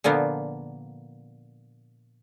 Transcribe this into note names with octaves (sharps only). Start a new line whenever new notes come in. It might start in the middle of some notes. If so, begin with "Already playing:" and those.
A#2 D3 F3 A#3 B3